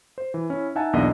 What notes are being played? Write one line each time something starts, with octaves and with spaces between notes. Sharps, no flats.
C5
E3
C#4 E4
D#4 E5 F#5 G#5 A5
B1 E2 A#3 D4 D#5